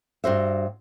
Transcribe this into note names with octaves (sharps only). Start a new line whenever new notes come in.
G2 F#4 C5 E5